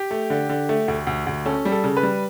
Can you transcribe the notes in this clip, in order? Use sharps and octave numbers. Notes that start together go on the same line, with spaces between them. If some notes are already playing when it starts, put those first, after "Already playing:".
Already playing: G4
A3
D3
D3
A3
D2
D2
D2
C#4 A4
G3
A4
C#3
B4
G3